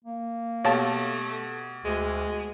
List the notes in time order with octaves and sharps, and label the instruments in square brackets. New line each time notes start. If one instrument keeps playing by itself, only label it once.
[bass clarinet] A#3
[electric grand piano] B2 G4 [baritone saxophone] A3 [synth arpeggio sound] C#5 F5 A5
[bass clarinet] D2 [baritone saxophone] G#3